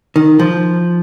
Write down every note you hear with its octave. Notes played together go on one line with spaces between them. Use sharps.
D#3
F3